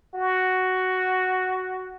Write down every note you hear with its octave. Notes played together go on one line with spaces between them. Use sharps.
F#4